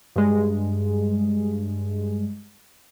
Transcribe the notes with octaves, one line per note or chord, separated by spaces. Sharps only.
G2 G#3